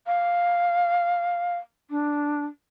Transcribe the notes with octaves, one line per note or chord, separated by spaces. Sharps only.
F5
D4